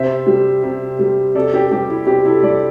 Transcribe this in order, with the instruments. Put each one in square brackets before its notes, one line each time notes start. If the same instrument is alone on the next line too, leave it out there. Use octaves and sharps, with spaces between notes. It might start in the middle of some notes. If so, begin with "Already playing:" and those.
Already playing: [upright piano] C3 C5 E5
G3
C3
G3
C3 A4 D5
G4
G3 G4
E4
C3 G4
E4 A4
G3 A4 D5